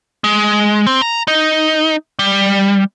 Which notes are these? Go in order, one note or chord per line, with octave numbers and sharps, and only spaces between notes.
G#3
C4
A#5
D#4
G3